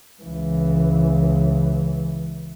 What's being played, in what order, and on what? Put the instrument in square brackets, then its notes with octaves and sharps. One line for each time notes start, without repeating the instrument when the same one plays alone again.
[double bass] C#2 E3